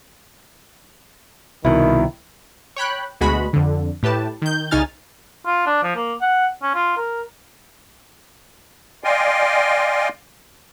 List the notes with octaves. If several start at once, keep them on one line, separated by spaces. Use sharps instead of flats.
C2 B2 D#3 E4
C#5 G5 B5 F#6
D2 B2 G#3 F#4 B5
F2 D3
A2 G4 B4 A5
D#3 G6
C2 C#3 D#4 G#5 F6 A6
F4
D4
F3
A#3
F#5
C#4
F4
A#4
D5 D#5 F5 G5 G#5 C6